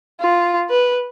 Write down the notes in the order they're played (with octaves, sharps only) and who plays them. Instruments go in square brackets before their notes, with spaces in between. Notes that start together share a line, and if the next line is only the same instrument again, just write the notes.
[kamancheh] F4
B4